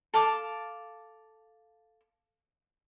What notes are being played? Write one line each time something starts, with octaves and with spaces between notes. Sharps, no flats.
A4 F5 A5 D6